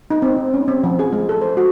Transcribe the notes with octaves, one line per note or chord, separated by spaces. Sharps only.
D#4
C4
D#4
C#4
C4
F3
G#4
G#3
A4
C5
F#4